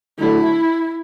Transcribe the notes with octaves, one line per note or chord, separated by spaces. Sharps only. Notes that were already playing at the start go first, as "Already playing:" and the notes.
D3 F#3 A3 E4